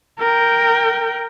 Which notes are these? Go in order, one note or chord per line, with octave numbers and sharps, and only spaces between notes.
A#4 G5